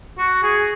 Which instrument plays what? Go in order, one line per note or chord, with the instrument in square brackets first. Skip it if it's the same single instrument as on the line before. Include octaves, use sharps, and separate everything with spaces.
[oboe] F#4
G#4